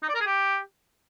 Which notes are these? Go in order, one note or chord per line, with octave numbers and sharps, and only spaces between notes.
D#4
D5
A#4
G#4
G4